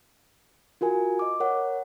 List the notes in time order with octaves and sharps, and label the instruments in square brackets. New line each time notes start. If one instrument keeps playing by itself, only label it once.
[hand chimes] F4 F#4 A#4 G#5
D#5 D6
A#4 C#5 F#5